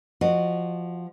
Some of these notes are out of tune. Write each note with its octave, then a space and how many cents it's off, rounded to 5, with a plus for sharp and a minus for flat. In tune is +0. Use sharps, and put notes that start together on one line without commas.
F3 +0 F#4 +0 D#5 -25